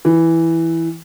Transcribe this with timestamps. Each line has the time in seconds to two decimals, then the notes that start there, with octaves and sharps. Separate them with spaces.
0.05 E3